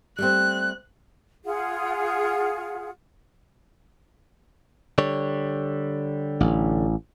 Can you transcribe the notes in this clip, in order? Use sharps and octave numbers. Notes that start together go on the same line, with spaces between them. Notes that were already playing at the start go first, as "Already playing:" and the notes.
G3 A3 C4 F#6
F4 G#4 F#5
D3 G3 C#5
A1